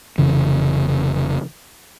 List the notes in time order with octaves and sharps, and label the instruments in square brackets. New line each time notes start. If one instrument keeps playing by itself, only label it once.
[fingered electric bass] F1 C#3 E3